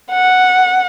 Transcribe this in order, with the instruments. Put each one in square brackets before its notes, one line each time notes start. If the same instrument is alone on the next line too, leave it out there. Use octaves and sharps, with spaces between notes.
[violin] F#5